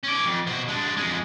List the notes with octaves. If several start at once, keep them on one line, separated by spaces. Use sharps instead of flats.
C#4 D5
F2
B2 C5
G#3 D4
F2 G#3